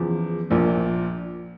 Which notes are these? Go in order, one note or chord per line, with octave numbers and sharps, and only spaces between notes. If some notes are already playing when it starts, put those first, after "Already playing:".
Already playing: E2 C#3 F3
A#1 A#2 F3